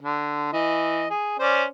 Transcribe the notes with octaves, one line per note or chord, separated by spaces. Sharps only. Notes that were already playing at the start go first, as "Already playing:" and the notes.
D3
E3 D#5
G#4
C#4 C5 D5